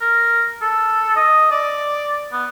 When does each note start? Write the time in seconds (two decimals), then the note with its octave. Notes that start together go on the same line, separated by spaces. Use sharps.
0.01 A#4
0.62 A4
1.16 D#5
1.51 D5
2.33 B3